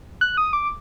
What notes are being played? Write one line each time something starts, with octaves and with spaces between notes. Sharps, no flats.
F#6
D#6
D6